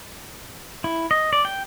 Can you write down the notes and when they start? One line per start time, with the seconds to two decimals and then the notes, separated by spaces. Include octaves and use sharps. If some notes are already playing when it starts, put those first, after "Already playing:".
0.84 E4
1.11 D#5
1.33 D5
1.45 G5